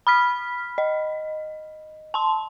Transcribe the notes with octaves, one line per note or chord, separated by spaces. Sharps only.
B5 F6 B6
D#5
A5 C6